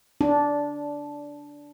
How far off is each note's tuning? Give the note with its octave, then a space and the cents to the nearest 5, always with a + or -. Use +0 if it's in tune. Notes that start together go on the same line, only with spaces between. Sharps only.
D4 -10